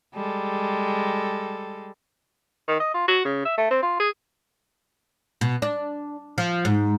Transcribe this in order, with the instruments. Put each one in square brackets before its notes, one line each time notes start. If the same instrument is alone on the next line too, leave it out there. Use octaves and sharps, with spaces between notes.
[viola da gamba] G3 G#3 A4
[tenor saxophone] D#3
D#5
F4
F#4
C#3
E5
A3
C4
F4
G#4
[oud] B2
D4
F3
G#2